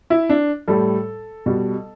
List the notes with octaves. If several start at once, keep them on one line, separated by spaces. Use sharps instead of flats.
E4
D4
A2 G3 A4
B2 G3